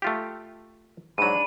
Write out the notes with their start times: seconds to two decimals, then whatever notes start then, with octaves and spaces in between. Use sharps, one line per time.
0.02 A3 F4 G4
1.18 G#2 F#3 D4 B5 D#7